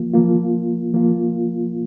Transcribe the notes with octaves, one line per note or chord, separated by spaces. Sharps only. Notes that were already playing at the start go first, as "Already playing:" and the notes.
Already playing: F3 A#3 F4
F3 A#3 F4
F3 A#3 F4